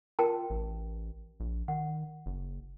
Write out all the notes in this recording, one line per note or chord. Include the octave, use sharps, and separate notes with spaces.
F4 A#4 G5 A5
A1
A#1
D#3 F#5
F#1